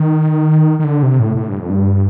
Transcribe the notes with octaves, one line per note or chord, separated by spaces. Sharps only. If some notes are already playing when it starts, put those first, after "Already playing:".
Already playing: D#3
D#3
D3
C3
A2
A2
G2
F2
G2